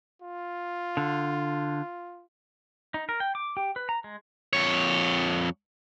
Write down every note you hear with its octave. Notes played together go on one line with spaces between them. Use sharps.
F4
D3
D#4
A#4
G5
D6
G4
B4
A#5
G#3
F2 C#5